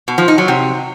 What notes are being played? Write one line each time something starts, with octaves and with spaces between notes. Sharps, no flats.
B2
F3
D#4
F#3
C3